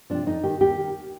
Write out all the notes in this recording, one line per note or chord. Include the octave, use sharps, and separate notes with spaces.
C3 F3 D4
F2 D#4
D#3 G4
D#2 G4
D#3